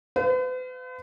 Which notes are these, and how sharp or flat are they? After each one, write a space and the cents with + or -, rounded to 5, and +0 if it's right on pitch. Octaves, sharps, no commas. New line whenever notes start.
B4 +45 F5 +5